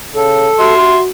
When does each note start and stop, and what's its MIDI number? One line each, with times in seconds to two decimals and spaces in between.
0.15 0.47 49
0.15 0.74 69
0.60 1.11 66
0.60 0.98 76
0.60 0.98 84